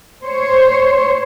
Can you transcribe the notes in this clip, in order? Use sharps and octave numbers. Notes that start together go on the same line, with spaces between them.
C5 C#5